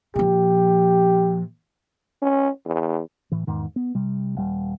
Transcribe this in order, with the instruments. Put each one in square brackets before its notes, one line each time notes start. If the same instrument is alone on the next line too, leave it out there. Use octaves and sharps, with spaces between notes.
[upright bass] A#2 F3 [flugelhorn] G4
[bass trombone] C#4
E2
[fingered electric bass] A2 E3
E2 G#2 D#3
B3
C3 G3
D#1 G3